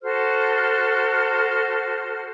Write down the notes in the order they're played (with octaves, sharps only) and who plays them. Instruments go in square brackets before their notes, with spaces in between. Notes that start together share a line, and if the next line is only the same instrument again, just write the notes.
[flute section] F#4 A4 C5 F6